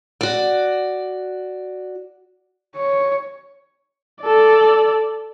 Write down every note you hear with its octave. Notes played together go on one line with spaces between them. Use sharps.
F#4 D5
C#5
A4 D5